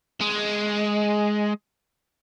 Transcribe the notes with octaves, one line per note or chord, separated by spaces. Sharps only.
G#3